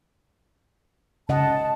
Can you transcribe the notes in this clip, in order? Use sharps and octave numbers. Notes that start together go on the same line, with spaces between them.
C#3 D#5 F#5 A5